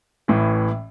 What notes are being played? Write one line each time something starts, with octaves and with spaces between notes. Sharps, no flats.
A1 A2 E3